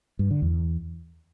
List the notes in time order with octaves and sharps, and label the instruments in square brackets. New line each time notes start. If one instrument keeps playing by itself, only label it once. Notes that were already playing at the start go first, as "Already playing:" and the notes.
[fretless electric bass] G2
D3
E2